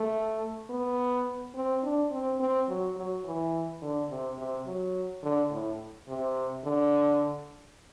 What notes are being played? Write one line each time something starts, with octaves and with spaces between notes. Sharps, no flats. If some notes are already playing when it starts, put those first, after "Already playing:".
Already playing: A3
B3
C4
D4
C4
C4
F#3
F#3
E3
D3
C3
C3
F#3
D3
A2
C3
D3